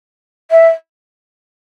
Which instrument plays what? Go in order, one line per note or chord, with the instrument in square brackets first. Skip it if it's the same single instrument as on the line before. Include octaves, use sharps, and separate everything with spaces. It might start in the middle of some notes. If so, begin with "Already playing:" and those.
[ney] E5